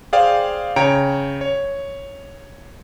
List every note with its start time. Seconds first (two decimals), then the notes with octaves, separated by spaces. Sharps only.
0.13 G#4 C5 D5 F5 G5
0.76 C#3 C#5 G5 A#5 D7
1.41 C#5